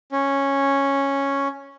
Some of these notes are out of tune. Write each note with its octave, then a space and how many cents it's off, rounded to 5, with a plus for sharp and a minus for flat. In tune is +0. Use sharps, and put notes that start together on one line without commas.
C#4 -5